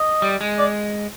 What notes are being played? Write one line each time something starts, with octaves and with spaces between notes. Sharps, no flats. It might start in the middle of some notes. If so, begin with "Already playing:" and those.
Already playing: D#5
G3
G#3
D5